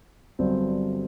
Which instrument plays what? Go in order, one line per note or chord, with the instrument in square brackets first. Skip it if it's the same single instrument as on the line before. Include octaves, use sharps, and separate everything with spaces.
[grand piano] G1 G2 F#3 C4